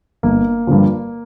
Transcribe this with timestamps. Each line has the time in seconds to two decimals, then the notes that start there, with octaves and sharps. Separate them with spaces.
0.23 G1 A#3
0.67 G2 D3 F3